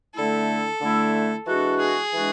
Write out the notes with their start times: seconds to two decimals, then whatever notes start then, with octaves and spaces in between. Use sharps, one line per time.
0.15 D3 A3 E4 A4
0.81 D3 A3 E4
1.46 E3 G#3 D4 F#4 A4
1.79 G#4
2.12 E3 G#3 D4 F#4